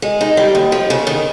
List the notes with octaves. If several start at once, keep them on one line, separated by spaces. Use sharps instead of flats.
G#3
D#4
G3
D#2
F3
C#3
D#3